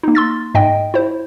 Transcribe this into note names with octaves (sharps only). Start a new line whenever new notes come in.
A#3 D#4
C6 E6 A6
G#2 D#5 G5
E4 C5